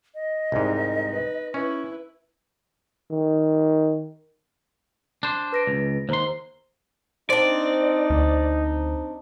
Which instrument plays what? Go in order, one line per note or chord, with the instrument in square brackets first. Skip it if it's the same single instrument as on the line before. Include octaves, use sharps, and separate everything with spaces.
[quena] D#5
[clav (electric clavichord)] C2 G#2 [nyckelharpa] D#4 A#4
[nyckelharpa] B4
[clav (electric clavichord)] C#4 [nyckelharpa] E4 B4
[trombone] D#3
[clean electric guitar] D4 C5
[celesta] B4 A#6 D7
[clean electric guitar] C#2
[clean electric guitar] D#2 C6 [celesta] C5 A#5
[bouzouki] C4 D4 [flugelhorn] D#4 [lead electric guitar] D5
[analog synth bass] D2